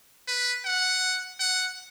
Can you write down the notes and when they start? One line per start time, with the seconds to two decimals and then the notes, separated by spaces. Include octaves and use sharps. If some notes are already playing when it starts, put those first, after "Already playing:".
0.28 B4
0.65 F#5
1.40 F#5